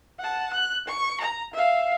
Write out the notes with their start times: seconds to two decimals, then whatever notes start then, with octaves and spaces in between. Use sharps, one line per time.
0.20 F#5 A5
0.53 F#6
0.88 C#6
1.21 A#5
1.54 E5 F5